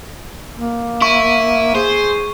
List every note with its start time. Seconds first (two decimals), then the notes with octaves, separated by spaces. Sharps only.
0.55 A#3
1.02 E4 C#6
1.75 G#4 C5